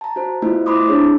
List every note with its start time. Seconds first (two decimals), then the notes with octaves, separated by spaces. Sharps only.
0.01 A5 A#5
0.16 F#4 C5
0.42 A3 B3 E4 F4 C5
0.66 E4 C5 B5 C6 D6 D#6
0.88 D4 G#4 C#5